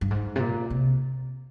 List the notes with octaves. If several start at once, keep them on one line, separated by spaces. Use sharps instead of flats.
G2
G#2
C3
A#2
C3